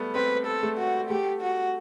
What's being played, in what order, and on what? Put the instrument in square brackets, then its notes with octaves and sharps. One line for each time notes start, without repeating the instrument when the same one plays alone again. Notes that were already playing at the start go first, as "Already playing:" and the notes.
Already playing: [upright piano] G3 A3 B3
[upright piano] C4 [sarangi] B4
[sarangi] A4
[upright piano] A3
[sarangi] F#4
[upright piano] A3 [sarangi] G4
[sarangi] F#4